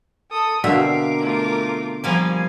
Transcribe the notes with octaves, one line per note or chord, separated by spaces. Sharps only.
A4 D#6
B2 D3 C4 A#4 E5 F5 D6
A3 F4
F3 G3 A#3 F5 G#5